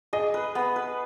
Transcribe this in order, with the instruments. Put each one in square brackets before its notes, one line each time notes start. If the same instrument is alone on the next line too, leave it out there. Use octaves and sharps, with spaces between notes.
[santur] G#4 [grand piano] D#5
[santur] B4
B3
B4